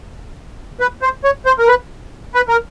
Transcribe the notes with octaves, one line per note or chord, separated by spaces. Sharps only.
B4
C5
C#5
C5
A#4
B4
B4
A#4